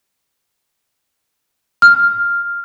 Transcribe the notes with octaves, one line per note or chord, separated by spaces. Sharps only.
F6